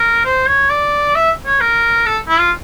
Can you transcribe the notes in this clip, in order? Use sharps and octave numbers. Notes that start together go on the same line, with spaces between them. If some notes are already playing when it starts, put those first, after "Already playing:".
Already playing: A#4
C5
C#5
D5
E5
C#5
A#4
A4
E4
F4